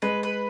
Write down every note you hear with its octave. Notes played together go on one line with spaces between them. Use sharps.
G#3 B4
B4